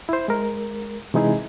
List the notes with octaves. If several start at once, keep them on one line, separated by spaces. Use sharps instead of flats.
E4 C5
G#3 A#4
C3 E3 G#3 D#4 E4 G#4